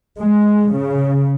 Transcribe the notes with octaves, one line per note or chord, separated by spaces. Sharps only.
G#3
C#3